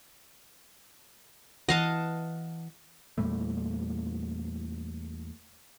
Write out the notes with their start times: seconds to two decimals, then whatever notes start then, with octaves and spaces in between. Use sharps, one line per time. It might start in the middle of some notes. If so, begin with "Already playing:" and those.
1.69 E3 D#5 F5 F#5 A5
3.18 E2 A#2 G3 A3